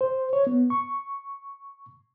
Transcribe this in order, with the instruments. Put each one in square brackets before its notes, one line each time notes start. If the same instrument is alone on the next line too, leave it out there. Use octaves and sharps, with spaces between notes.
[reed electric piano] C5
C#5
B3
C#6